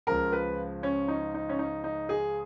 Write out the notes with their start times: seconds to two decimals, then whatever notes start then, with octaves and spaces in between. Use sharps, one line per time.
0.07 C#2 C#3 F3 A#4
0.32 B4
0.83 C#4
1.08 D#4
1.34 D#4
1.49 C#4
1.59 D#4
1.84 D#4
2.09 G#4